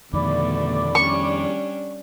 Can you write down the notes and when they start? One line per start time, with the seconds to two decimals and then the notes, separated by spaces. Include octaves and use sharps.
0.13 F2 B2 D3 D#3 A3 D5 B5 D6
0.95 G3 C#4 D4 C#6